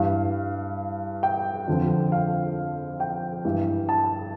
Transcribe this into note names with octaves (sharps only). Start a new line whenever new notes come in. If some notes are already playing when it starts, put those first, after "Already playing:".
Already playing: G2 E3 F5
G5
F2 D3 F3
F5
G5
G2 E3
A5